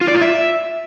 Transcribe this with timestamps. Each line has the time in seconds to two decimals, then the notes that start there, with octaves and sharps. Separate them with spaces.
0.01 F4
0.08 D5
0.15 F4
0.21 E5